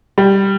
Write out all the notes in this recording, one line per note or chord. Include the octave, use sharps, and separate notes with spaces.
G3